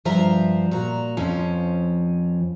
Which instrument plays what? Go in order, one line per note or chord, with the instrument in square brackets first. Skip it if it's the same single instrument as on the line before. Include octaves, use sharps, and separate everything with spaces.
[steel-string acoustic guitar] G2 F3 C5 E5 A#5
A#2 F#4 A#5
F2 F3 C#4